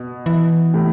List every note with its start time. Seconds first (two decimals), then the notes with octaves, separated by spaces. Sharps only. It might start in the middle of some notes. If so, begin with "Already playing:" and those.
Already playing: B2
0.26 E3
0.74 A2 C3